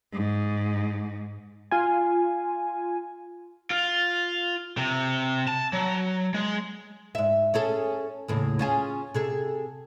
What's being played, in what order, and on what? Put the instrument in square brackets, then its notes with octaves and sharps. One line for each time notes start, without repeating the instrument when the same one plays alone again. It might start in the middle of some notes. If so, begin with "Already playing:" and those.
[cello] G#2
[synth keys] F4 G#5
[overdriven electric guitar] F4
C3
A5
F#3
G#3
[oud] G#2 E5
C#4 G#4 A4
D#2 A2 C#3
C#4 F4 G#4
C3 G#4 A4